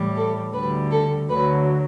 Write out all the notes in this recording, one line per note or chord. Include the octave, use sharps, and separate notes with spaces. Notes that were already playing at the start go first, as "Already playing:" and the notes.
Already playing: A2 E3 G3
A4
D2 D3 G3 B4
A4
D2 D3 F#3 B4